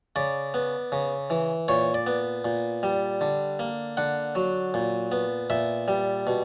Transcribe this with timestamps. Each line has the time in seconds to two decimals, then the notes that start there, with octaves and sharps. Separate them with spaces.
0.16 C#3 D5
0.54 B3
0.92 C#3
1.30 E3
1.68 A#2 C#5
1.94 D5
2.07 B3
2.45 A#2
2.83 G3
3.21 D3
3.59 A#3
3.97 D3 F#5
4.35 F#3
4.74 A#2
5.12 B3
5.50 A#2 E5
5.88 G3
6.27 B2